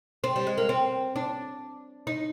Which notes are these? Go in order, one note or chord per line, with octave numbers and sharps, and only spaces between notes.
C4
G3
G#3
A#3
C4
D4
D#4